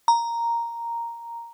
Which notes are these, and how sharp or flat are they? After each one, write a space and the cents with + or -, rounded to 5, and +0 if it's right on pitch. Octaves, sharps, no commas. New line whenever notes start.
A#5 +0